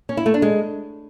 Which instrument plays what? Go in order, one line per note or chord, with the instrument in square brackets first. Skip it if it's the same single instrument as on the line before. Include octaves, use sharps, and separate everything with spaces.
[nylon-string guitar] C#4
E4
A3
D4
G#3